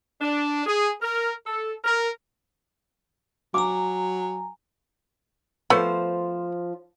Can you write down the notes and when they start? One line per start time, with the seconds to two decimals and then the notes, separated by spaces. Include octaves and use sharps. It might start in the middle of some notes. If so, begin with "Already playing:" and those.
0.21 D4
0.66 G#4
1.02 A#4
1.47 A4
1.84 A#4
3.54 F#3 G#5 A#5 D6
5.70 F3 A3 B3 C5